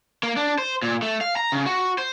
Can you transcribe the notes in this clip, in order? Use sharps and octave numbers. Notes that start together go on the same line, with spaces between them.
A#3
D4
C5
A#2
A3
F5
A#5
C#3
F#4
C5